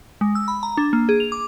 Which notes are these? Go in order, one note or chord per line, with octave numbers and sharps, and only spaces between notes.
G#3
E6
B5
A#5
D4
A#3
G#4
F7
D6